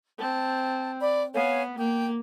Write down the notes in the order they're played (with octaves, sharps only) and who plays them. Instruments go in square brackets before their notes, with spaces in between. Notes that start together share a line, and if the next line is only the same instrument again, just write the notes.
[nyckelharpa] C4 [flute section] A5
[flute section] D5 B5
[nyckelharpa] B3 [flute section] C#5 F5 G#5
[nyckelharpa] A#3 [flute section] G5